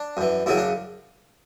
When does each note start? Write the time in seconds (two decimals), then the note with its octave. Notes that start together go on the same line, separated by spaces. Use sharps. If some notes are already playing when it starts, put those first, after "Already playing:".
Already playing: D4
0.17 F#2 E3
0.46 F#2 C#3 F#3 E4
0.57 D4